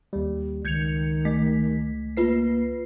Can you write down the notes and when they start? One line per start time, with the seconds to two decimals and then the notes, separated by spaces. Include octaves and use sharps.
0.13 D#2 G3
0.65 C#2 D#3 G6 G#6 C#7 F7
1.25 A3 B6
2.17 A#3 F4 B4 C7